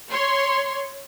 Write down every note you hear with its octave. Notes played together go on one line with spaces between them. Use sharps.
C#5 C6